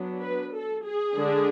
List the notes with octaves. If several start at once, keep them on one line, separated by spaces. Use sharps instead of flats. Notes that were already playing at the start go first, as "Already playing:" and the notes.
Already playing: F#3 B3 D4
B4
A4
G#4
D3 G#3 D4